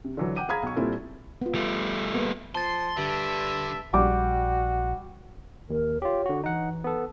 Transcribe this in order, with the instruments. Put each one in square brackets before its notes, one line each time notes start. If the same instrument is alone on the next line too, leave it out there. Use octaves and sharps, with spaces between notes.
[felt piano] C3
D3 E3 F#3
F#5 G5 D6 D#7
G#4 F5 A#5 B5 G#6
B1 C#6
A#2 G3 C4 E4 F4 A4
[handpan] B3 F4
[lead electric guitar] G3 A3
[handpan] A#3 B3 A#4
[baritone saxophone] F3 [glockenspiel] A5 A6 [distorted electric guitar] C6
[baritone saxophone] G2 [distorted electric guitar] D3 [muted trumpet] E5
[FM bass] A#1 [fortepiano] G3 D6 [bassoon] F#4
[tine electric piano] D#2 [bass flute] A#4
[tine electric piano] F4 G4 [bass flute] C#5
[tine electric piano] D3 F#4
[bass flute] E3 [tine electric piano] D#4 F#5
[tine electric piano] B3 A4